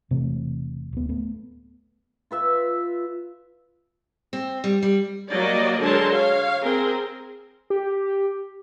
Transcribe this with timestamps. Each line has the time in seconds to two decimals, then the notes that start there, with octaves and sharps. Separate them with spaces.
0.11 E1 C3 E3 A3
0.93 D1 B3
1.09 A3 B3
2.31 F4 B4 E5
4.33 C4
4.64 G3
4.83 G3
5.32 F#3 G3 A#3 D5 D#5
5.80 D3 F#3 G#3 A#4 A5 C6
6.13 C#5 F5
6.62 C4 G#4 A#4
7.70 G4